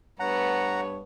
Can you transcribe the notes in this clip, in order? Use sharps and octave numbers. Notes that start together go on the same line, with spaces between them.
G2 A3 B3 C#5 F#5 A#5